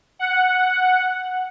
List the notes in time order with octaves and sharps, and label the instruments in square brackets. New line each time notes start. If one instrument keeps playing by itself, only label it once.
[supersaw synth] F#5